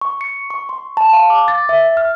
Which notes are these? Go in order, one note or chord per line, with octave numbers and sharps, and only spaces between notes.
C#6
C#7
C#6
C6
A5
F5
D6
A6
E5
F6